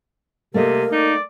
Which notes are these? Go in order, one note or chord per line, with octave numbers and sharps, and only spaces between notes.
C3 A3 A#3 A#4 D#5
D#4 D5